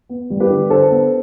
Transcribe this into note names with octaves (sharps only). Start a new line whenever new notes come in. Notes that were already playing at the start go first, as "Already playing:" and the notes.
B3
G3
G4 B4
D3
D3 A4 C5
B3